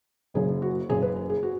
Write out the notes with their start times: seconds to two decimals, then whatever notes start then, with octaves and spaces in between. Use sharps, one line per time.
0.34 F#1 F#2 C#3 G#4
0.62 F#4
0.89 F#1 F#2 C#3 G#4
1.02 B4
1.16 G#4
1.30 G#4
1.43 F#4